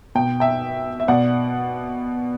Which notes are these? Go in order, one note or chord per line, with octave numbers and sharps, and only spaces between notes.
B2 G5
E5 G5
E5
B2 D5 F#5